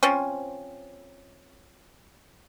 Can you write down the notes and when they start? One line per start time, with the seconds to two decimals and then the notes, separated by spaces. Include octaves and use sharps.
0.03 F3 C4 C#4